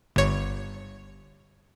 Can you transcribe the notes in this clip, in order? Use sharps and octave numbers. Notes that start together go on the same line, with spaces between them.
G1 C#5